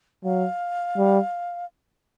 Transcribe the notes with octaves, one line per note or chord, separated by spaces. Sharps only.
F#3 F5
G3